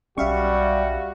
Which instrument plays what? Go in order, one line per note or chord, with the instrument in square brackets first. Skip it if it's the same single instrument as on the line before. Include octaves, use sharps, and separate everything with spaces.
[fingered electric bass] B1 C#4 [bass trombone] G3 [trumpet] F#4 [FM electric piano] E5 F5 C#6